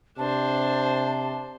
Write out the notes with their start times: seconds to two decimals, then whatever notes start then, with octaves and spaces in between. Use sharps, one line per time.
0.18 C3 D4 C5 A5